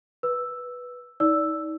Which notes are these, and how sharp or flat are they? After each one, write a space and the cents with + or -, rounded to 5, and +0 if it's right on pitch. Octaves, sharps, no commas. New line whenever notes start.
B4 -5 E6 +0
D#4 +35 D5 -20 E6 +0